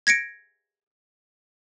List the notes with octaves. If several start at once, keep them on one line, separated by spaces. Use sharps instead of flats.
G#6 A#6 C#7 D7